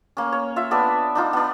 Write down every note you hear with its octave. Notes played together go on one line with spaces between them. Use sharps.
A#3 C#4
C#5
F4 E5
B3 D4 D5 E5
D4 D#4 F4
B3 D4